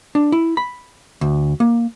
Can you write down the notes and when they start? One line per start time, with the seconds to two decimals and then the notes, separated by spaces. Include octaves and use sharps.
0.15 D4
0.32 E4
0.57 B5
1.21 D2
1.60 A#3